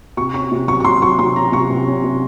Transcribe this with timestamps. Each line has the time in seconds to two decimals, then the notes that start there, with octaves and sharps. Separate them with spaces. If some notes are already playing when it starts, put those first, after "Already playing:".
0.17 C3 C#6
0.34 C#4 C#6
0.52 C3
0.68 F#3 C#6
0.80 C#6
0.85 F#3 C6
1.02 F#3 C#6
1.19 C3 C6
1.36 C#4 A#5
1.52 C3 C#6
1.69 C3
1.87 C#4
2.04 C3